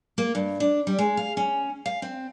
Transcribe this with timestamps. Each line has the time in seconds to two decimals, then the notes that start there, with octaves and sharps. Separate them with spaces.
0.18 A#3
0.35 G2
0.60 D4
0.87 G3
0.99 G#3
1.17 F5
1.37 C#4
1.86 F5
2.02 C4